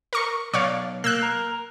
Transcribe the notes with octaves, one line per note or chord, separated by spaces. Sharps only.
A#4 C#6
B1 C#5 D5 F5
A#3 E6 F#6
A#4